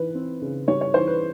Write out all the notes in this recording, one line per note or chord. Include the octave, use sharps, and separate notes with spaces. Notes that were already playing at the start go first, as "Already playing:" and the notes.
Already playing: E3 B4
C4
C#3
G3 C#5
C#5
E3 C5
B4